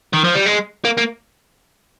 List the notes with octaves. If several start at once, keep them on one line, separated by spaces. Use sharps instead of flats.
D#3
F3
G3
G#3
A#3
A#3